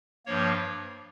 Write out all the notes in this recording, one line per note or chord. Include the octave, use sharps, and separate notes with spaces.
G2 F3 A#3 C#5